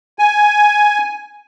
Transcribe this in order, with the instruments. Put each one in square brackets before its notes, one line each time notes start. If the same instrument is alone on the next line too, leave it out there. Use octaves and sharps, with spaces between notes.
[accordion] G#5